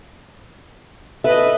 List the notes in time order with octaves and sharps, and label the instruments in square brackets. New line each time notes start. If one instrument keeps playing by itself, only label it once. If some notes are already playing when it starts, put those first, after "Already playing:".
[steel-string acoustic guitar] A4 E5 [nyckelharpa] B4 D#5